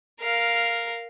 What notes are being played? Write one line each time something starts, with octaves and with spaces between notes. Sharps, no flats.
A#4 F5